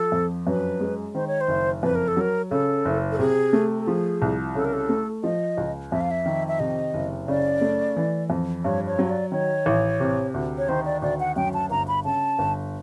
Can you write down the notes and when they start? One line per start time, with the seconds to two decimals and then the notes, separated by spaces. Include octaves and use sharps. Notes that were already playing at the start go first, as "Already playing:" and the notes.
Already playing: F3 A4
0.12 F2
0.47 F#2 B4
0.81 G#3
1.15 D#3 C5
1.27 C#5
1.41 C5
1.48 F#1
1.82 F2 B4
1.95 A#4
2.08 A4
2.17 F#3 A#4
2.51 C#3 A4
2.85 F#1
3.11 A4
3.19 C3 G#4
3.53 A3
3.79 A4
3.87 F3 G#4
4.22 C2
4.55 C#3 A4
4.65 A#4
4.73 A4
4.89 A3
5.24 F3 D#5
5.57 C#2
5.91 F2 E5
6.01 F5
6.11 E5
6.26 D#3
6.48 E5
6.59 C3 D#5
6.94 F#1
7.28 C#3 D5
7.61 A3
7.97 E3
8.30 F2
8.64 G2 C#5
8.87 C#5
8.99 F#3
9.05 C#5
9.10 D5
9.32 D#3 C#5
9.66 A1
10.00 C3
10.34 D2
10.58 C#5
10.69 D#3 C5
10.85 D5
11.02 D2 D5
11.20 F#5
11.36 F#2 G5
11.54 A5
11.70 G1 A#5
11.88 B5
12.05 C#3 A5
12.39 G1